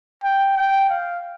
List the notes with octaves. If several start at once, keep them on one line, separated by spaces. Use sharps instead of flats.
G5
G5
F5